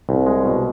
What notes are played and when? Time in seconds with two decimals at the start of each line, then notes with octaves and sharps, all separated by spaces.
0.09 C2
0.26 G#3
0.45 B2